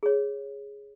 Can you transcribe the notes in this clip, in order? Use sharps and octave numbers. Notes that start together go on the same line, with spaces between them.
G#4 C#5